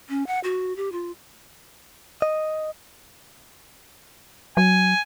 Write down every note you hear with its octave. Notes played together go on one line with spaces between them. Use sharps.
C#4
F#5
F#4
G4
F4
D#5
F#3 G#5